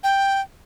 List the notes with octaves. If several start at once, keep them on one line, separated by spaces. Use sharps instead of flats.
G5